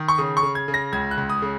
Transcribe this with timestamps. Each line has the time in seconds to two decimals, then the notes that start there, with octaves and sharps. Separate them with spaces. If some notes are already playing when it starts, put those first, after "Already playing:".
Already playing: D#3
0.08 C#6
0.18 C#3 D#6
0.37 C#6
0.43 C#3
0.55 G#6
0.68 C#3
0.74 A#6
0.92 C#2 G#6
1.11 F#6
1.17 C#2
1.30 D#6
1.42 C#3